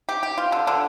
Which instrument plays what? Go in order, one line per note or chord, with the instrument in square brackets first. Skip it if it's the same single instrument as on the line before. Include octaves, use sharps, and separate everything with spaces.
[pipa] G4
G4
F4
D3
D3